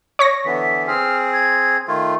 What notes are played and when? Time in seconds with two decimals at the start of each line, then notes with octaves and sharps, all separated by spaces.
0.19 C#5 C#6 A#6
0.45 D3 E3 B3 B6
0.87 C4 G#4 F6
1.33 G#6
1.88 D#3 A3 F4